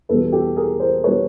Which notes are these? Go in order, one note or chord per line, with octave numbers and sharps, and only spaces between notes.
E2 B2 G3 A4 B4
G4 A4
G#4 A#4
A#4 C5
B2 G3 B4 C#5